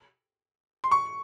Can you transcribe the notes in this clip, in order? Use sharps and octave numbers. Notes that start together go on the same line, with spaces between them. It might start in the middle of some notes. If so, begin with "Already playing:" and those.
C6
C#6